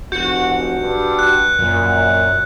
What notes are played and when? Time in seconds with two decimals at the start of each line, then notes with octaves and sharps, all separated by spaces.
0.12 F1 F#4 G6 C#7
0.82 G2
1.19 F#6
1.59 F#2 A#2